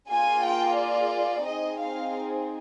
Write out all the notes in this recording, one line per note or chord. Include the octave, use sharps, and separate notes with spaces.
A#3 F4 G#4 G#5
G5
D5
C4 D#4 G#4 D#5
F5